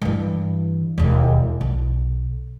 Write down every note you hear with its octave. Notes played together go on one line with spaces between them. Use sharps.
G2 E3
E1 D#2
B1